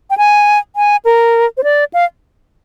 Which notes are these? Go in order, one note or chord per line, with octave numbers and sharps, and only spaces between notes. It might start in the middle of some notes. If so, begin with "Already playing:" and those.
G5
G#5
G#5
A#4
C5
D5
F5